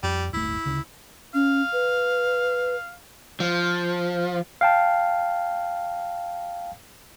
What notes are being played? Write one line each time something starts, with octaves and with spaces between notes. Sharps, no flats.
F2 G3
D1 G1 A3 E4
D2 C#3
C#4 F5
B4
F3
F5 G5 A5